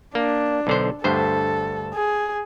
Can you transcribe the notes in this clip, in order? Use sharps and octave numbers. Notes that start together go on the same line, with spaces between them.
A#3 D4
B1 D3 C5
D2 G2 A4 C5
G#4